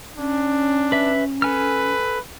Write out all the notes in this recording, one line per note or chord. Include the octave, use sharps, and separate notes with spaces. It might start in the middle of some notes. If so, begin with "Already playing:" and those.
C#4 D4
B4 E5
A4 B4 G#5 F6